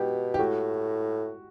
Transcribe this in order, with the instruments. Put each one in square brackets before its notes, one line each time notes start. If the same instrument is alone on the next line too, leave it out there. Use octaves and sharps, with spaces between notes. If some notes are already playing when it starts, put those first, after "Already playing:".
Already playing: [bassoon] B2 [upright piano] G4
[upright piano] G4
[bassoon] A2 [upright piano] F#4